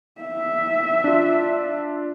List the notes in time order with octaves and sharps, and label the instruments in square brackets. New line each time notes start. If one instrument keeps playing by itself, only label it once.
[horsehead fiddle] E5
[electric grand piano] D4 F4